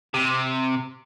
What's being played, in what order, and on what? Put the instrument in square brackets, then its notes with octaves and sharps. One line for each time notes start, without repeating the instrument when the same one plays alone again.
[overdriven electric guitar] C3